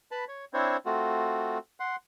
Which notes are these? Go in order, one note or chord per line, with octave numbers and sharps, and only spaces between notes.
B4 A5 B5
C#5
C4 D4 E4 C5 C#5
A3 C4 F4 F#4
F#5 C6